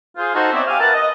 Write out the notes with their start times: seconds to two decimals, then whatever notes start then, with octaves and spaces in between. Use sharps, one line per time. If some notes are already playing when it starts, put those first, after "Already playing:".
0.17 F4 G#4 C5
0.34 D#4 F#4 A4 C5
0.53 B3 C4 C#5 D5 E5
0.67 G4 F5 G#5
0.80 A#4 B4 E5 F#5 A5
0.94 D#5